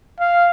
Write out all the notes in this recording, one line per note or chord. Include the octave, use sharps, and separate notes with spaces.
F5